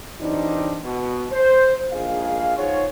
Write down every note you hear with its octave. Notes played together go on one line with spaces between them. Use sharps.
E3 F#3 G3 C4 D4 D#4
B2
C5
A#1 G#2 D#4 G#4 F5
D#4 F4 F#4 G#4 C5 C#5